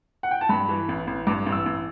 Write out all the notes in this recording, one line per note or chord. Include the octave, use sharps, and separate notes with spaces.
F#5
G5
A5
G2 B5
E3
A1
A1
G2 D6
A1
E6
A1